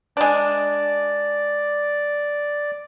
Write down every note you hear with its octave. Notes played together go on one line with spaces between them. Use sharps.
G#3 D4 D5